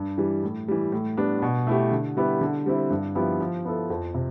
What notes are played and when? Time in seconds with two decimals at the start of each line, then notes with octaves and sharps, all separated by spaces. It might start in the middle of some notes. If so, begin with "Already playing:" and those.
Already playing: G2
0.18 E3 G3
0.43 A2
0.68 E3 G3
0.92 A2
1.17 G3 B3 D4
1.42 B2
1.67 A3 E4 G4
1.91 D3
2.17 G3 B3 E4 G4
2.41 D3
2.66 G3 C4 E4
2.90 G2
3.15 F3 B3 E4 G4
3.40 F3
3.65 B3 E4 A4
3.90 F2
4.14 C3